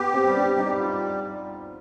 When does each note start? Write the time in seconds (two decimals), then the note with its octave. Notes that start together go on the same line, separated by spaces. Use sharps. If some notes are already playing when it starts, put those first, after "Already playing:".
Already playing: B3 G4
0.14 C4
0.25 G3
0.36 D4
0.58 G3 D#4
0.80 F4